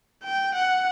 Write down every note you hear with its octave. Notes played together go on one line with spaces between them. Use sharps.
G5
F#5